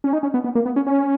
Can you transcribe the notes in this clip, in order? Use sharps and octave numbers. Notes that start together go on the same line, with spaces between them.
C#4
D#4
C#4
B3
B3
A#3
B3
C#4
C#4